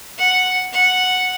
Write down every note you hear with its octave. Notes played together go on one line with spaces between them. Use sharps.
F#5
F#5